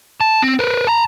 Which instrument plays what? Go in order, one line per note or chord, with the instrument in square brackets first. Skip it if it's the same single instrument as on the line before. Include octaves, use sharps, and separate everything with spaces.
[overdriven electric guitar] A5
C4
A#4 B4
A5 A#5